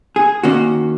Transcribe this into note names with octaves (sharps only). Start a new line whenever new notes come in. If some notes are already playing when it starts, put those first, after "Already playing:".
G#4
D#3 A#3 C#4 F#4